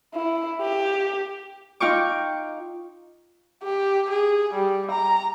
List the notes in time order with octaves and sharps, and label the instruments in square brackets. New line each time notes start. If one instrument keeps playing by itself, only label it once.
[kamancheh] E4
G4
[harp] D#4 F4 G5 C#6 D6
[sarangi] G4
G#4
G3
A#5